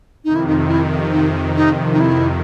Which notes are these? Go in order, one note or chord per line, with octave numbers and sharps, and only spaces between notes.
F2 C3 D#3 D#4
E4
D#4
E4
D#4
D#4
D#4
E4